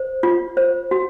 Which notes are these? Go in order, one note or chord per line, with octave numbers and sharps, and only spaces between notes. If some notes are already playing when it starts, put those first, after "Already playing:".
Already playing: C5
F4
C5
F#4